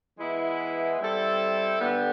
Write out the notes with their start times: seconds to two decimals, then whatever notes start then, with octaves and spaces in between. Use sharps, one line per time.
0.19 E3 G#3 B3 E4
1.00 G3 C4 E4 A4
1.80 D3 G3 B3